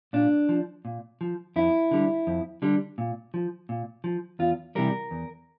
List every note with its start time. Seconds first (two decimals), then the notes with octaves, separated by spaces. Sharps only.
0.13 A#2 D4
0.49 F3
0.85 A#2
1.21 F3
1.56 F2 E4
1.91 D3 G3
2.27 F2
2.62 D3 G3
2.98 A#2
3.34 F3
3.69 A#2
4.04 F3
4.39 E2 F4
4.75 C3 E3 G3 A#4
5.11 E2